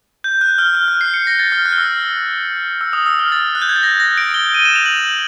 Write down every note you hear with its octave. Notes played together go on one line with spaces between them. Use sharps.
G6
F#6
F6
F6
F#6
C7
C#7
A#6
A6
F6
F#6
F6
E6
E6
D#6
E6
F6
A6
F#6
G6
G#6
A6
A#6
A#6
D7
G7
D#7
E7
F7
F#7